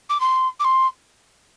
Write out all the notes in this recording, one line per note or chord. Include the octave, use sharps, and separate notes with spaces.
D6
C6
D6
C6